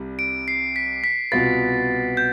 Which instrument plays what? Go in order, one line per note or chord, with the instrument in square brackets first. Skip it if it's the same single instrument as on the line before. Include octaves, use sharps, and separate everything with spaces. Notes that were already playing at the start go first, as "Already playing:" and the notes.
Already playing: [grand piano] C2 C3 G3
[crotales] D7
C7
B6
B6
[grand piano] C2 B2 B3 F4 B4 [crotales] A6
[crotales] G6